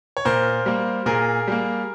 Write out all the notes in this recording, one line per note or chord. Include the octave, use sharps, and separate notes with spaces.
C#5
A#2 A#4 C5
G3 A#3
A#2 G#4 A#4
G3 A#3